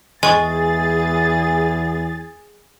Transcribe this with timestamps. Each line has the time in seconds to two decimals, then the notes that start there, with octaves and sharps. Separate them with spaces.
0.23 E2 G#3 G#4 G#5 C#6 A6